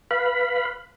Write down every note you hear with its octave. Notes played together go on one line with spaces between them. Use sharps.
B4 F5 B5